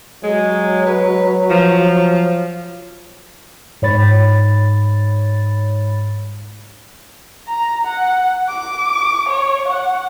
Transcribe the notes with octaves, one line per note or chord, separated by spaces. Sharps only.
F#3 G#3
B4
F3
G#2 C#5 B5 A6
A#5
F#5
D6
C#5
F#5